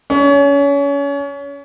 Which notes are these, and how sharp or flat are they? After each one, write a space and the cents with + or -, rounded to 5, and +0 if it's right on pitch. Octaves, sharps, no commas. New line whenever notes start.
C#4 +30